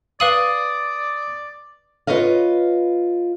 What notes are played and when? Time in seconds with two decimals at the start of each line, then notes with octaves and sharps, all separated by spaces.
0.20 B4 D5 F5 D#6 F#7
2.07 F4 G#4 B4 C#5 D#5 F5